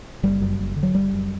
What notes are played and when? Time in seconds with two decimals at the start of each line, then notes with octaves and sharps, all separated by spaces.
0.23 F#1 G3
0.41 F#2
0.59 F#1
0.76 D3
0.83 F#3
0.94 F#1 G3
1.12 F#2